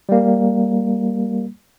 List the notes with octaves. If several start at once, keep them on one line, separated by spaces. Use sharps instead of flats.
G3 A#3